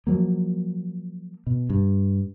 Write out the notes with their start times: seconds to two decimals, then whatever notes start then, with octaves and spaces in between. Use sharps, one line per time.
0.07 F3 F#3 A#3
1.47 B2
1.70 G2